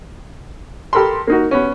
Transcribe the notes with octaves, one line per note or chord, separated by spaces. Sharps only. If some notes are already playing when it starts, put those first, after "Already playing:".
G4 A4 A#4 B5 C6
A#3 D#4 F#4
B3 C#4